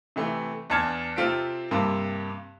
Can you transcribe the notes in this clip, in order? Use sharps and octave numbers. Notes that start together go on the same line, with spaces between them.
C3 E3 A3
E2 D4 A5 F6 G#6
C3 C4 F4 A4 B6 D7
G2 C3 A#3 A5 C6